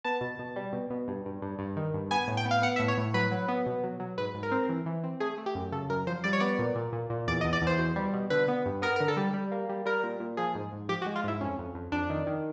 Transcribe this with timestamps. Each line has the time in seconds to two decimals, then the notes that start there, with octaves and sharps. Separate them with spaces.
0.04 B3 A5
0.21 B2
0.39 B2
0.56 G3
0.73 B2
0.90 B2
1.08 G2
1.25 G2
1.42 G2
1.59 G2
1.76 D#3
1.94 G2
2.11 B3 G#5
2.28 A2
2.37 G5
2.45 B3
2.51 F5
2.62 B3 F#5
2.76 E5
2.80 A2
2.88 C#5
2.97 A2
3.14 F#3 B4
3.31 F#3
3.48 B3
3.66 B2
3.84 F#3
4.00 F#3
4.18 G#2 B4
4.34 G#2
4.43 A#4
4.51 C4
4.69 E3
4.86 E3
5.04 C4
5.20 A3 G#4
5.38 A3
5.46 G4
5.55 F#2
5.72 C#3 A4
5.89 F#2 A#4
6.07 F3 C5
6.24 G3 D5
6.33 C#5
6.40 B3 D5
6.59 A#2
6.75 A#2
6.92 A#2
7.10 A#2
7.27 E2 D5
7.41 D#5
7.44 E2
7.53 D5
7.62 E2
7.67 C5
7.79 B2
7.96 G3
8.13 B2
8.30 D3 B4
8.48 B3
8.66 G2
8.82 B3 A#4
8.96 D3 A#4
9.08 A4
9.17 G3
9.34 G3
9.52 A#3
9.69 G3
9.86 G3 A#4
10.03 A#2
10.20 A#2
10.37 F3 G#4
10.55 G#2
10.73 G#2
10.89 F3 G4
11.02 F#4
11.06 G#3
11.16 F4
11.24 G#2 E4
11.41 F2 C#4
11.59 F2
11.75 F2
11.92 F2 D4
12.10 D#3
12.27 D#3